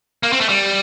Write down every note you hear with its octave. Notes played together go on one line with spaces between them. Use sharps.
A#3
C4
A3
G3